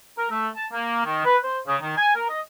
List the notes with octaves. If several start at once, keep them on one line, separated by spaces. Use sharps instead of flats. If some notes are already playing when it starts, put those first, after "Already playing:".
A#4
A3
A5
A#3
D#3
B4
C5
C#3
D#3
G#5
A#4
D#5